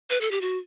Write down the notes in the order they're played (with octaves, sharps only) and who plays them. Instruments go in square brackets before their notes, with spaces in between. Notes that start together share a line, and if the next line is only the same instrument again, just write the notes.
[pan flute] B4
A4
G4
F#4